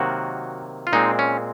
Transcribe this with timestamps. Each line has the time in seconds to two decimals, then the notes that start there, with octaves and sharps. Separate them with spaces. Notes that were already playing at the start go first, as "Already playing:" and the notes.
Already playing: C3 D#3 F#3 A#3 F#4
0.87 F4
0.93 A#2 G#3 C4 D#4
1.19 C#4